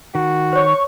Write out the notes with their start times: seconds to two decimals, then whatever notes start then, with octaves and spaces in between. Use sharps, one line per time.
0.15 D#3 F#4
0.53 C5 C#5 C#6